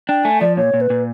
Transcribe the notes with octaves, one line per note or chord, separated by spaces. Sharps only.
D4 G5
A3 G#5
F3 D5
A#2 C#5
A#2
B4
A#2